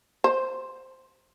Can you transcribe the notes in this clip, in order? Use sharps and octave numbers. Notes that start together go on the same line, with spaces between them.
C5